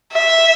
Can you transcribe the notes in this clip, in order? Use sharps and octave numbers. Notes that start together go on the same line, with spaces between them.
E5